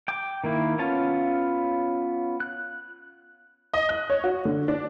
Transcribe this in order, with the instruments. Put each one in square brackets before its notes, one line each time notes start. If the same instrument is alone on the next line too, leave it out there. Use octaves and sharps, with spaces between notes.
[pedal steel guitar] G5 D6
D#3 A#3 E4
B3 C#4 F4 A5
F#6
[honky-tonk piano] D#5
F#6
C#5
F#4
D3
D4